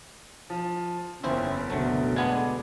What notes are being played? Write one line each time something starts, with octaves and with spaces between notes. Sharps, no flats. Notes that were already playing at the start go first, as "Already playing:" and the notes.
F3
F#1 E2 C4 C#4 E4 C5
D2 B2 D3 F#3 A3
G#3 B3 D4 G#6